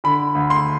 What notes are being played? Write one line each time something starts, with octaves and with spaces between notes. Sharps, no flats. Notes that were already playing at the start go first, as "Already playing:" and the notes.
D3 B5
D2
C6